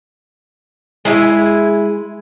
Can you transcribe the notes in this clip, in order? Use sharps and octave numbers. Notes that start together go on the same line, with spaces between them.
G#3 E4 G#5